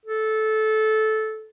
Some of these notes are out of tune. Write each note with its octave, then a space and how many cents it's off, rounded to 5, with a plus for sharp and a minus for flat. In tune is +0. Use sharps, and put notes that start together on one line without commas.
A4 -15